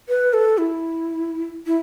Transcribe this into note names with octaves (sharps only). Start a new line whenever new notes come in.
B4
A4
E4
E4